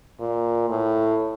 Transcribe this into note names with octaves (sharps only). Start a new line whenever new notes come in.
A#2
A2